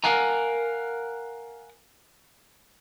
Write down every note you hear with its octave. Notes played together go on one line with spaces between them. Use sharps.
A#4 C5 F5 F#5 G#5 A#5